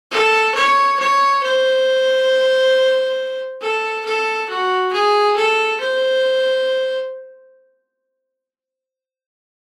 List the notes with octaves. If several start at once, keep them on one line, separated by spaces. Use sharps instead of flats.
A4
C#5
C#5
C5
A4
A4
F#4
G#4
A4
C5